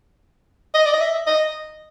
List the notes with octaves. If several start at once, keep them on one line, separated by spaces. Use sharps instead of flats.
D#5
D5
D#5
E5
D#5